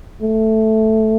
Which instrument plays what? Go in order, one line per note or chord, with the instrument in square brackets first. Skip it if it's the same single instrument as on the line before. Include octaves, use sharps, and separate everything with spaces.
[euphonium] A3